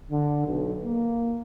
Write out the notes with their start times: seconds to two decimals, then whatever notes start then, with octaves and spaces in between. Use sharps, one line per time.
0.11 D3
0.46 B1
0.84 A#3